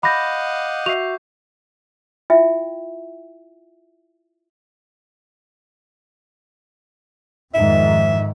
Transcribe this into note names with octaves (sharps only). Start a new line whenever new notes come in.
D#5 F5 F#5 B5 D6 G6 A#6
F#4 E5 C#6 C7 F7
E4 F4 E5 G5
F2 G#2 D#3 E5